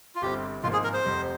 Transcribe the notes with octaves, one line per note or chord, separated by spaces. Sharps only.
F4
G1 G2 G3 C4 G4
G#1 G#2 F3 A#3 F4
G#4
A#4
C5
F1 F2 C3